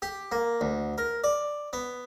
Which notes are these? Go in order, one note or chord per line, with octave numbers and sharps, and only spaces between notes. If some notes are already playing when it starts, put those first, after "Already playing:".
G4
A#3
D2
A#4
D5
B3